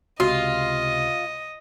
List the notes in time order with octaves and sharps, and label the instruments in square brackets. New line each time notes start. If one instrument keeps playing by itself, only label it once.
[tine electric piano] C#2 C3 [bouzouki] F4 [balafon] F#4 [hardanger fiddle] D#5